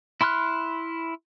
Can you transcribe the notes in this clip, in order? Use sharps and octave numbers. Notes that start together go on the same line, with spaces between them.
E4 B5 C6 F6 F#6